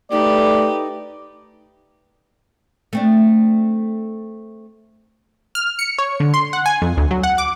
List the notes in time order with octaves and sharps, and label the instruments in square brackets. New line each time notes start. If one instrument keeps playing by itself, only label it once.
[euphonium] A3 [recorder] D#4 [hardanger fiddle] G4 B4 [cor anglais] D5
[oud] A3 C4 D4
[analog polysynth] F6
C#7
C#5
D3
C6
F#5
G#5
F2
D2
F#3
F#5
D6